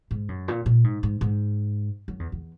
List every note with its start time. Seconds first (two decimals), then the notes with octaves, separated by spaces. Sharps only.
0.11 G#2
0.29 F#2
0.48 A#2
0.66 A#2
0.84 G#2
1.03 G#2
1.21 G#2
2.08 F#2
2.19 E2
2.32 E2